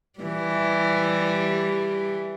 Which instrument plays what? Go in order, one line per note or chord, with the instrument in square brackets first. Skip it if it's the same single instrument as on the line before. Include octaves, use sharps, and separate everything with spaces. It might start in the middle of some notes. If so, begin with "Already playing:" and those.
[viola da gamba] E3 G3